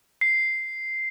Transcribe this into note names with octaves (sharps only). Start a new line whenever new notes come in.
C7